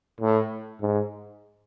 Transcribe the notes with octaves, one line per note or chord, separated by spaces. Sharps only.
A2
G#2